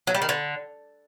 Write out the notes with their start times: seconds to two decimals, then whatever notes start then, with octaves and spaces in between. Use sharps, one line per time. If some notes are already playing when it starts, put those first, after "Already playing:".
0.07 F#3
0.14 G3
0.22 D#3
0.29 D3